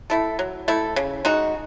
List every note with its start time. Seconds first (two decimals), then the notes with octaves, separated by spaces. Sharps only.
0.10 A3 E4 A4
0.39 F#3
0.68 A3 E4 A4
0.96 C#3
1.25 G#3 D#4 F#4